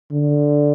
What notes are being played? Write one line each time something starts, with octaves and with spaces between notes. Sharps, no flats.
D3